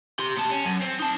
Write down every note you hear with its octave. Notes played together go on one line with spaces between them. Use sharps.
G4 C6
B2 A5
C#4
F#2
C4
D#4 A5